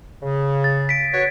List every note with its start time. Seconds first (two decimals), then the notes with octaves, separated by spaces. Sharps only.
0.23 C#3
0.64 A6
0.89 B6 D7
1.13 F#4 B4 C#5